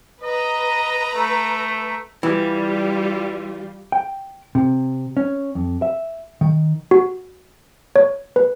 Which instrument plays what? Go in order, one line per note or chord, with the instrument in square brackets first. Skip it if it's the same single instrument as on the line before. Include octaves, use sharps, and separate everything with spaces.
[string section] B4 A#5 [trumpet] D#5
[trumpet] A3
[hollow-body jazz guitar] E3 [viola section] G3 F4
[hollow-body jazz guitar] G5
C3
C#4
F2
E5
D#3
[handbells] F#4
C#5
B4